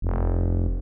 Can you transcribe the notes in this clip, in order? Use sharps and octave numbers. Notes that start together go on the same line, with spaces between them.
F1